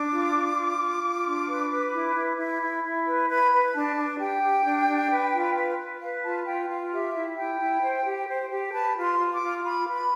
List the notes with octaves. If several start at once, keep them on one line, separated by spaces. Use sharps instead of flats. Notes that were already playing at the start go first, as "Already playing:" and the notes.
Already playing: D4 D6
F4
F4
F4
F4
F4
D4
B4
B4
E4
E4
E4
E4
E4
B4
B4 B5
B4
D4 A5
D4
G4 G5
G4
D4
D4
B4
F4
B4
B4
B4 F5
F4 A5
F4 G5
F4 F5
G4 E5
E4
E4 G5
E4
C5
G4
C5
G4
B4 A5
F4
C6
F4
D6
F4
F4 B5
B4
B5